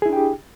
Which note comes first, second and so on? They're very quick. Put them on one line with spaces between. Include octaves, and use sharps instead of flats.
G#4 E4 D4 G5 G4